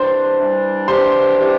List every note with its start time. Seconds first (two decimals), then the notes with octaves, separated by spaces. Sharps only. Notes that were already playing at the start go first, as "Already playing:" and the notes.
Already playing: C3 E3 G3 D4 C5 C6
0.37 C3 E3 G3 D4
0.88 E3 G3 D4 G4 C5 C6
1.38 E3 G3 D4 G4